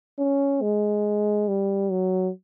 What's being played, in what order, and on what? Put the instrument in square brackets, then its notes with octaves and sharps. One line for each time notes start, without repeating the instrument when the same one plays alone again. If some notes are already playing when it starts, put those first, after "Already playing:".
[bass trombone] C#4
G#3
G3
F#3